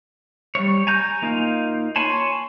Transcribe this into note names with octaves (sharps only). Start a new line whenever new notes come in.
G3 C#5
G#5 A#5 G6
A#3 D#4 F4
C#5 G#5 A5 B5 C6